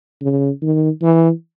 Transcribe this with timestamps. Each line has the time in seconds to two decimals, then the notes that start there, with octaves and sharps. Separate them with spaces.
0.22 C#3
0.62 D#3
1.02 E3